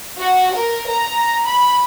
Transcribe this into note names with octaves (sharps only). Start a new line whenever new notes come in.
F#4
A#4
A#5
B5